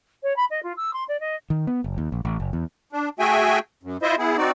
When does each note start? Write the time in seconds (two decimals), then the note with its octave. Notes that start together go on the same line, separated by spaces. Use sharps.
0.23 C#5
0.36 B5
0.50 D#5
0.63 F4
0.77 E6
0.93 C6
1.08 D5
1.20 D#5
1.50 D#3
1.67 B3
1.84 F#1
1.98 D#2
2.12 A#1
2.25 A1
2.40 F#1
2.53 E2
2.93 D4
3.19 A3 F#4 G#4 E5 G5 G#5
3.83 F#2
4.03 E4 F4 C5 D#5 E5
4.18 B3 E4 G#4
4.38 C4 D#4 F#4 D5